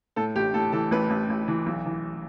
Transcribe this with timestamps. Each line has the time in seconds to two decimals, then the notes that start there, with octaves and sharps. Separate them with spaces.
0.16 A2 A4
0.36 A1 G4
0.54 A2 A4
0.72 E3 A4
0.91 A1 B4
1.10 A1
1.30 A1
1.48 E3
1.67 B1
1.86 E3